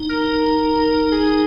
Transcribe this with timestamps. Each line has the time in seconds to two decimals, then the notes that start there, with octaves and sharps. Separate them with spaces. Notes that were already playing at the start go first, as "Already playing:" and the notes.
Already playing: D#4
0.09 A#4
1.12 G#4